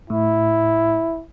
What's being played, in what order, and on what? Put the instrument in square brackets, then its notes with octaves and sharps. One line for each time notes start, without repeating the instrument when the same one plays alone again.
[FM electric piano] A2 [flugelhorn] E4